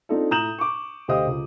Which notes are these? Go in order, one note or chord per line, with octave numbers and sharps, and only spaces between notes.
C4 D4 D#4 F4 A4
A2 A#5 D#6 G6 E7 F#7
C#6 D6
D2 G4 C5 D#5 F5 D#6
C#2